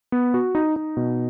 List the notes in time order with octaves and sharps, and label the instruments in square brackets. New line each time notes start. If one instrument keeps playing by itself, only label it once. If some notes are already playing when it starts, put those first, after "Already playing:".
[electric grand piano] B3
F#4
D#4
D#4
B2